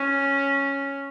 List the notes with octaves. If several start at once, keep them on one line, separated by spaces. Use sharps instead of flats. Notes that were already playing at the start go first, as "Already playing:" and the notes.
Already playing: C#4